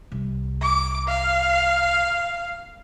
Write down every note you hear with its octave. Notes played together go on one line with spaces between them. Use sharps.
C2
D6
F5